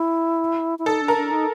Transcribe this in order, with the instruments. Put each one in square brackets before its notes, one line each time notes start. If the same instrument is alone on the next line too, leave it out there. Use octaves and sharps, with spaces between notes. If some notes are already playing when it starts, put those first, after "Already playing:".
Already playing: [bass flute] E4
E4
[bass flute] D#4 [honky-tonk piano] A4
[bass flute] D4
[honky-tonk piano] A#4
[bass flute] D4
D#4